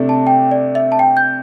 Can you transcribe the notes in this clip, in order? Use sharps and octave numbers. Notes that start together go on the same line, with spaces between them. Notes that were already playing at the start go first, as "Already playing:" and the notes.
Already playing: C3 A3 D4
A5
G5
D5
E5
A5
G5
G6